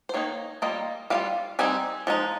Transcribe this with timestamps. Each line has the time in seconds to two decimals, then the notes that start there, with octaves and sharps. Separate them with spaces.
0.09 C5
0.14 D#3 A#3 D#4 C#5
0.62 G3 A#3 F4 D#5
1.10 G3 C#4 F4 F5
1.59 G3 C4 D#4 G#5
2.07 F3 G#3 D#4